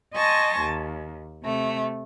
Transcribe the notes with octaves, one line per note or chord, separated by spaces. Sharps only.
D#5 G#5 A5 C6 C#6 A#6
D#2
C3 A3